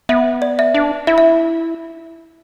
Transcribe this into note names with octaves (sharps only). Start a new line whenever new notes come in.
B3 E5
D5
E5
D4
E4 E5
E5